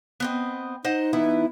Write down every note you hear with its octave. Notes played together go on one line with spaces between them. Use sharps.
B3 C4 D#5
D#4 C5 D#5 F#5
E3 B3 E4